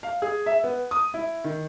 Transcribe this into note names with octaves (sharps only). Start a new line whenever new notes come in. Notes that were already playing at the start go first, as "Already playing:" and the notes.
F5
G#4
E5
B3
D#6
E4
D#3